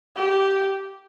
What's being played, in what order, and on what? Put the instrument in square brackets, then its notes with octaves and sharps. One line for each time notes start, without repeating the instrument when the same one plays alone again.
[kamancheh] G4